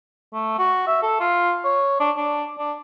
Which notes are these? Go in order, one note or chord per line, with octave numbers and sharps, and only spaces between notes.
A3
F#4
E5
A4
F4
C#5
D4
D4
D4